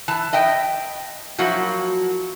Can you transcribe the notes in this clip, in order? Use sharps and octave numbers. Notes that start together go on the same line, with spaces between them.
E3 A5
D#5 E5 G5
F3 F#3 A#3 E4 F#4